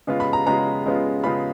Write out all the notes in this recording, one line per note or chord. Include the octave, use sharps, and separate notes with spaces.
C#3 G#3 B3 F4
B5
A#5
C#3 G#3 B3 F4 A#5
C#3 G#3 B3 F4
C#3 G#3 B3 F4 B5